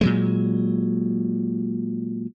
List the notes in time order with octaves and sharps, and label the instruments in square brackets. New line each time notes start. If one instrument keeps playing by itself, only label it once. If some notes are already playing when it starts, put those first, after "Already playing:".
[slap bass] A#2 F#3 G#3